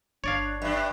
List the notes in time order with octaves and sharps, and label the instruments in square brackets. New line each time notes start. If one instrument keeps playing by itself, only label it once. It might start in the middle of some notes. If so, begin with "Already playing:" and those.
[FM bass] G1 [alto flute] D4 [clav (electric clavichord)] C#5 D5 F5
[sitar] G2 D4 [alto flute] E5